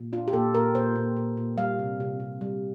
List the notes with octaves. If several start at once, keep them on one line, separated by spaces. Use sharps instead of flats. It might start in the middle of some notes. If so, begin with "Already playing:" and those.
Already playing: A#2
D4 F4
G4
A#2 A4
A#2 A#4
A#2 C5
A#2
A#2
A#2
G3 F5
C3
C3
C3
G3